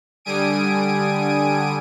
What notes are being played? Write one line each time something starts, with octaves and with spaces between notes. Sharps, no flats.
D3 G3 G#5 D#6 D7 D#7